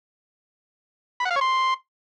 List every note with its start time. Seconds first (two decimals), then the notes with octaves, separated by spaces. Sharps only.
1.20 B5
1.25 F#5
1.31 F5
1.36 C#5
1.41 C6